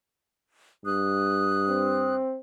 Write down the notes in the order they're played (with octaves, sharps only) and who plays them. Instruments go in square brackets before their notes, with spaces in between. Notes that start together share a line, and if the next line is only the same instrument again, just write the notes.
[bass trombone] G2 [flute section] D#6 F#6
[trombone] C4